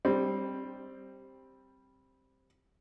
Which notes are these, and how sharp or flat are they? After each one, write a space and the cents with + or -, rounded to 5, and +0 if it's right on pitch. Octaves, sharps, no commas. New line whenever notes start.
G3 +0 C4 +10